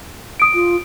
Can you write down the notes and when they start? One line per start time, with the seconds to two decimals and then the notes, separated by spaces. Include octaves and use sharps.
0.40 D#6 D7
0.54 F4